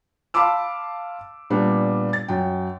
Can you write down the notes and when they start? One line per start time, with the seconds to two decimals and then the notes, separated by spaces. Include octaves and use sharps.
0.34 F5 A5 B5 C6 D6 E6
1.50 A#2 G3 B3 D4
2.13 A6
2.28 F#2 G5